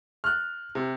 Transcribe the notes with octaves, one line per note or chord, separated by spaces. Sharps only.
F6 F#6
C3